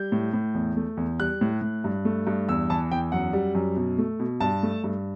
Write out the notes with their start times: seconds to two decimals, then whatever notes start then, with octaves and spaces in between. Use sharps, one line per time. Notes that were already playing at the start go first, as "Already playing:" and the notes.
Already playing: G3 G6
0.12 A2
0.34 A2
0.55 E2
0.77 A3
0.97 E2
1.20 G3 F#6
1.41 A2
1.62 A2
1.84 G2
2.05 A3
2.27 G2
2.49 E2 E6
2.70 E3 A5
2.91 E2 G5
3.12 F#2 F#5
3.33 G3
3.55 F#2
3.76 B2
3.98 A3
4.20 B2
4.40 G2 A5
4.63 A3
4.84 G2